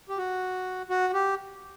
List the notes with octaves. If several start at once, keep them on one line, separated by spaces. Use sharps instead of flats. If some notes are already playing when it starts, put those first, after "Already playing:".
G4
F#4
F#4
G4